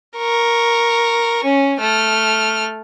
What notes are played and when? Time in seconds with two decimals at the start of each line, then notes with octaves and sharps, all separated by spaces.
0.18 A#4 C#6
1.44 C#4
1.81 A3 F6